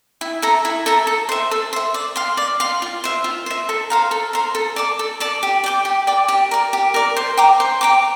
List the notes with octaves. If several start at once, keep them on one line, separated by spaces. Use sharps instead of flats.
E4
A4 E5 A#5
E4
A4 E5 A#5
A4
C5 E5
A4
C5 E5
D5
F5 C6
D5
F5 C6
F4
C5 E5
F4
C5 E5
A4
C5 F5 A#5
A4
C5 F5 A#5
A4
D5 A5 D6
A4
D5 A5 D6
G4
D5 G5 D6
G4
D5 G5 D6
G4
A#4 D5
G4
A#4 D5
C5
G5 A#5 D6
C5
G5 A#5 D6